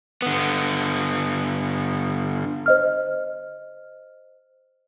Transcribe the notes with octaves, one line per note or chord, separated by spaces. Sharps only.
D3 B3
C5 D#5 F6